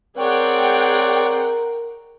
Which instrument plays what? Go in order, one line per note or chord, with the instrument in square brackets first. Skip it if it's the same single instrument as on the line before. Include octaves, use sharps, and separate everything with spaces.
[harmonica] C4 C#5 D5 [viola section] G#4 F#5 G5 [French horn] A#4